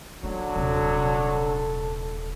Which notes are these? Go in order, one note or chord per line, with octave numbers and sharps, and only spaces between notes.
D3 F#3 A#3
D#1 C3 A4